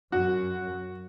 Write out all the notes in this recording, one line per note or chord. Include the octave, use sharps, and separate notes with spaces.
F#2 F#4